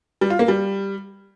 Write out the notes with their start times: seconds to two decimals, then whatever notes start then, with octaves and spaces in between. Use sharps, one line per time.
0.21 G3
0.30 F4
0.39 A#3
0.48 G3